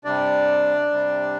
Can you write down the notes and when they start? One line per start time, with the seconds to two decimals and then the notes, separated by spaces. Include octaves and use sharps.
0.05 C3 G3 D4 D5
0.91 C3 G3